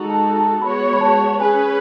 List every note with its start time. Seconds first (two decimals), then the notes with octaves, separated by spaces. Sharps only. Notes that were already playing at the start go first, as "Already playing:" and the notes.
Already playing: G#3 D#4 F#4 A4
0.10 A5
0.36 A5
0.62 G#3 B3 F#4 C#5 B5
0.93 B5
1.01 A5
1.40 C#4 G#4 B4 G#5